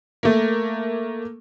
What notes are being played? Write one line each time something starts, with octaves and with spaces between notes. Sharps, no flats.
A3 A#3